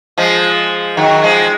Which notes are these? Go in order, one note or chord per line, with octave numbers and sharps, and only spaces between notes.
F3 G#3
D#3 F#3
F3 G#3